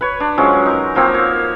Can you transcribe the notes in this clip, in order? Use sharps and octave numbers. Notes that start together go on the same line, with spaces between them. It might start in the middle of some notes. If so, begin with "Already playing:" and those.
B4 C#5
D4
F3 F#3 G#3 C#4
D#4 A#4
F3 A#3 C4 C#5
C#5